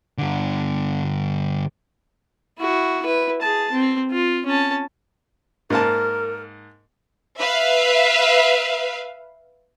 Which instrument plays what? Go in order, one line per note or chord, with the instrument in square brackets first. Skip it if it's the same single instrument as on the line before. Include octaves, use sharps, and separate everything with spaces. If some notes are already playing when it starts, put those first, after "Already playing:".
[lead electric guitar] G2 D3
[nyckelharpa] E4 F#4
E4 B4
G#4 A5
C4
F4
C#4 A5
[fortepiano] G#2 A#3 A5 [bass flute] A#4
[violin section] B4 E5 F5